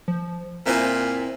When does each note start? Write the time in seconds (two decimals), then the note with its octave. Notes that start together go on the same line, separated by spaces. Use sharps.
0.08 F3
0.66 A#2 C4 E4 C5 G#5